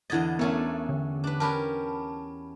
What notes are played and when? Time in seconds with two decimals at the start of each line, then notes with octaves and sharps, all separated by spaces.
0.10 E2 D3 E4 D#5 G#6 A6
0.39 A3 B3 C#4 D4 A#4
0.89 D3
1.24 D4 B4
1.40 C#4 G4 A#4 A5 B5